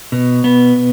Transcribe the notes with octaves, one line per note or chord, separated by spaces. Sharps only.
B2
B3